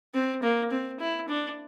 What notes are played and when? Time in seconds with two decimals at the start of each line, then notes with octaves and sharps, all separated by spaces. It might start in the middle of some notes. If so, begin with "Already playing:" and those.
0.14 C4
0.43 A#3
0.71 C4
1.00 E4
1.28 D4